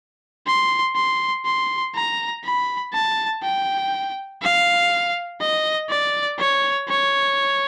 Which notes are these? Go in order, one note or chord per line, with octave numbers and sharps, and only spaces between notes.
C6
C6
C6
A#5
B5
A5
G5
F5
D#5
D5
C#5
C#5